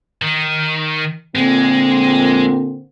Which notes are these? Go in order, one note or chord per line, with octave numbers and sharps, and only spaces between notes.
D#3
A#2 D3 G#3 C4